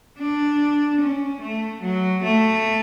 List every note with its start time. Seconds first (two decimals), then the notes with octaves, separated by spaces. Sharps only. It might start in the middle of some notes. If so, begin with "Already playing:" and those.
0.18 D4
1.00 C#4
1.41 A3
1.82 F#3
2.23 A3